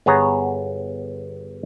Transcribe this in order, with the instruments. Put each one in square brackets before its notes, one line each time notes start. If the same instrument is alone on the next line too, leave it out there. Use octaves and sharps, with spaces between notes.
[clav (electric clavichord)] G1 B3 G#4 C#5 A#5